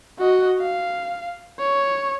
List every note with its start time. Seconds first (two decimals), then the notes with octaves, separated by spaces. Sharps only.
0.19 F#4 D#5
0.60 F5
1.59 C#5